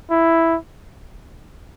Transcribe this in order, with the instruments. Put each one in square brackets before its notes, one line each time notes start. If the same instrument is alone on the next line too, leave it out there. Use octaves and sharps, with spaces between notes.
[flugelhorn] E4